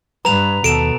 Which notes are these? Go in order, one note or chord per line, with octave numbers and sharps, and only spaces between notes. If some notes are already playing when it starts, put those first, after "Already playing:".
G2 B4 A#5 F7
D#2 B2 A4 D7 E7